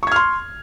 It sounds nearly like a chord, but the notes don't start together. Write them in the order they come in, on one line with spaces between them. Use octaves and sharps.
C#6 G#6 F6 C6